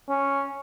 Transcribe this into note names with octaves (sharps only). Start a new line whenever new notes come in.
C#4